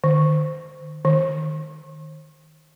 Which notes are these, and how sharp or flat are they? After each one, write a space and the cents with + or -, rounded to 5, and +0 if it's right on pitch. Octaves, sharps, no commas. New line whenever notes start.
D#3 -40
D#3 -5